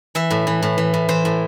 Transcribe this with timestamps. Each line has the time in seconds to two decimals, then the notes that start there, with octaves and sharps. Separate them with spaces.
0.15 E3 E5
0.31 A2
0.47 E3
0.62 A2
0.78 E3
0.94 A2
1.09 E3 C5
1.25 A2